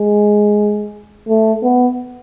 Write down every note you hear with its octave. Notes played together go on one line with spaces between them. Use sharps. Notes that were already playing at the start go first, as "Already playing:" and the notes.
Already playing: G#3
A3
B3